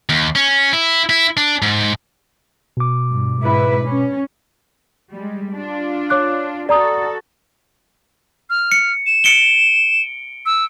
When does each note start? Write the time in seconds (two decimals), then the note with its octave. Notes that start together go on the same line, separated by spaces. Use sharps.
0.09 D#2
0.35 C#4
0.73 E4
1.10 E4
1.37 D4
1.62 G#2
2.77 B2 D6
3.11 G2
3.42 G#2 E4 B4
3.85 C#4
5.13 G3 G#3
5.52 D4 F4
6.10 C#5 D6 F#6
6.69 F#4 A4 D5 A#5 D#6
8.50 F6
8.72 C#7
9.06 E7
9.24 C#7 D7 G7
10.46 E6